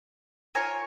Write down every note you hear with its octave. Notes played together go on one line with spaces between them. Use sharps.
F4 A#4 C#5 G#5